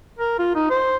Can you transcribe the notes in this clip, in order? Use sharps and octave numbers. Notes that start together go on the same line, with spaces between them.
A#4
F4
D#4
C5